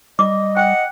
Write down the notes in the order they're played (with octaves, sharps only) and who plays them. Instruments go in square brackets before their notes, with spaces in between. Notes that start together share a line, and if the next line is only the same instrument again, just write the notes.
[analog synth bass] G3 [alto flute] D#5 [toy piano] D6
[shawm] F#5 [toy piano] G5